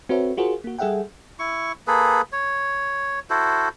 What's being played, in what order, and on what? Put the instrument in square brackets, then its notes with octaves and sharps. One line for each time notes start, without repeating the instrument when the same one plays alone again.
[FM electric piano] C4 F#4 A4 B4 C#5 E5
F4 F#4 G#4 A#4 C5
A#3 F#4
G3 G#4 A4 E5 F#5 G5
[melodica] E4 C#6
A#3 G#4 A4 B4
C#5
E4 F#4 A4 C5